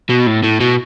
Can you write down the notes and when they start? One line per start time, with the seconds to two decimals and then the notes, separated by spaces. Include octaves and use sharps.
0.09 B2
0.27 A2
0.43 A2
0.60 B2